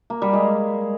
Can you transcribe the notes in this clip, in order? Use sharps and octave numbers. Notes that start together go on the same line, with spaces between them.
A#3
G3
G#3